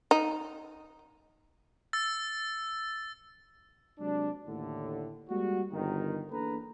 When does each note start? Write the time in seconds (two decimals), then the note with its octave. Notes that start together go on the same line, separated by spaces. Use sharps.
0.11 D#4
1.93 E6 A6
3.99 C3 F#3 G#3 D4
4.46 D#2 A2 D3
5.30 G3 G#3 A#3 F#4
5.71 G1 D#3
6.31 E2 A#3 D4 A4 B4 A#5